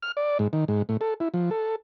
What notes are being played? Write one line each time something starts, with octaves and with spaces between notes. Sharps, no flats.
F6
D5
G#2
D#3
G#2
A2
A4
E4
F3
A4